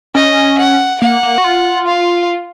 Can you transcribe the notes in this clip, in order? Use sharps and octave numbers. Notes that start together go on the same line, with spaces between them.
C#4 D#5
F#5
A#3 F#5
A#3
F#4
F4
F5